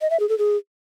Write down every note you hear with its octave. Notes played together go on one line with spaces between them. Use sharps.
D#5
E5
G#4
A4
G#4